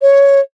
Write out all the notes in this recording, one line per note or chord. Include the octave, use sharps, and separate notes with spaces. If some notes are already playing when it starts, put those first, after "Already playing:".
C#5